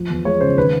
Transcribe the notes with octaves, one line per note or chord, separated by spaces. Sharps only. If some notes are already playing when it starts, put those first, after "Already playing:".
Already playing: F3
E2
G#3 C#5
C#3 C5
D#3 B4